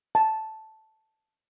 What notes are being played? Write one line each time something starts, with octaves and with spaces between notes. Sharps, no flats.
A5